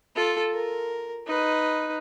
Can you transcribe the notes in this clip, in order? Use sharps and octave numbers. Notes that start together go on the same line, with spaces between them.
F4 A4
A#4
D#4 B4